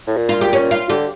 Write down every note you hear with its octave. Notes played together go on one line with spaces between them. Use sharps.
A2
A#2
F4
G4
C#4
F4
D3 G4